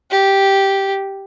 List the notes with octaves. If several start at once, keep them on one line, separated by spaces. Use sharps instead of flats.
G4